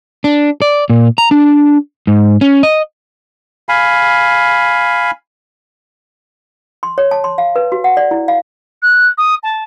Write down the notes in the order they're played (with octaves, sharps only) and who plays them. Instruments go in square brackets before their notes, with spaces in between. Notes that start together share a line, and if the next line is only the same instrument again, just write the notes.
[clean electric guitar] D4
D5
A#2
A#5
D4
G#2
C#4
D#5
[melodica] F5 G#5 B5
[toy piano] C6
C#5
A5
C6
F5
B4
F#4
F#5
D5
E4
F5
[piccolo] F#6
D#6
A5